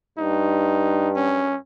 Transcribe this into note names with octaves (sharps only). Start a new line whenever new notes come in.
G2 D#4
C#4